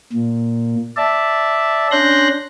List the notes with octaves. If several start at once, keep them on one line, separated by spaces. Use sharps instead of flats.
A#2
D5 E5 A5
C#4 D4 C6 F#6 G6 A#6